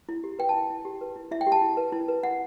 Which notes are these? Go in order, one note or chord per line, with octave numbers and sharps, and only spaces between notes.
E4
G4
B4 G5
A5
E4
E4
G4
B4
E4
E4 E5
G5
G4
A5
E4
B4
E4
B4
E4 F#5